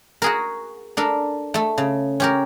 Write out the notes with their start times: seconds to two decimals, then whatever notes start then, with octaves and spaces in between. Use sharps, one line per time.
0.22 F#4 G#4 A#4
0.97 D4 A4 A#4
1.54 A3 A4
1.78 C#3
2.20 C#4 G4 A#4